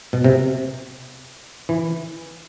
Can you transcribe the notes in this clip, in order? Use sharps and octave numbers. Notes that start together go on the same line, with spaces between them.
B2
C3
E3